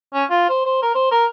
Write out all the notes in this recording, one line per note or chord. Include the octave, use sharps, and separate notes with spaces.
C#4
F4
C5
C5
A#4
C5
A#4